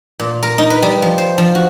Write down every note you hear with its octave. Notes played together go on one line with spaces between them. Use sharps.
A#2
A#4
D#4
B4
G3
F3
C5
F3
F#4